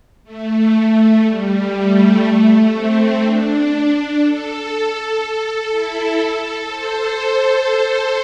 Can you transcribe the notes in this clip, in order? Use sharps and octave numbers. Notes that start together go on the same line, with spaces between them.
A3
A3
G3
A3
C4
D4
A4
A4
E4
A4
C5